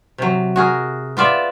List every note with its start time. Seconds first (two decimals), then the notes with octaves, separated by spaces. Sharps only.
0.18 C3 F#3
0.56 F#4 G#4 A#4
1.17 B3 F4 D5 E5